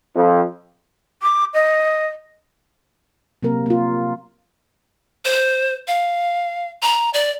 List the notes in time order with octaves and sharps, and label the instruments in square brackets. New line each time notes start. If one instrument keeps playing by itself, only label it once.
[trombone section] F2
[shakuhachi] D6
D#5
[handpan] C3 F#3 A#3 A#4
A#3 F4
[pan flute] C5
F5
A#5
D5